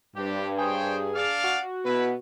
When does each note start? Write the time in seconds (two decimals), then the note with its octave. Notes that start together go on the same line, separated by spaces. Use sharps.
0.16 G2 C4 D4 G4
0.58 G#4 C5 C#5 G5
1.15 D4 D5 F5
1.44 F#4
1.85 B2 B3 E4 B4